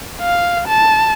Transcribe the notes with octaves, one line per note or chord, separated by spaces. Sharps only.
F5
A5